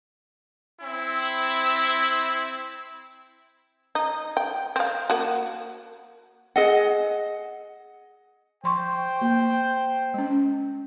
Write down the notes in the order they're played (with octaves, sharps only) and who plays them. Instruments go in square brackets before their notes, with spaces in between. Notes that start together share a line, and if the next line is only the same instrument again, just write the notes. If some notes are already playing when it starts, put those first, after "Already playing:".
[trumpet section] C4 E4
[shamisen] D#4
G5
C4 F5
A#3 F#4
[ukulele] G#4 D#5 F#5
[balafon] F3 C6 C#6 [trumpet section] C5 G5
[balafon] A#3
G#3 C#4